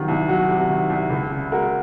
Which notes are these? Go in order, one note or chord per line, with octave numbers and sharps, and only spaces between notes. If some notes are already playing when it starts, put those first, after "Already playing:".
Already playing: C3 D#3 F#3 F4
C2
F#3 F#4
C3
D#3
C2
C#2
C#3
G#3 F#4 A#4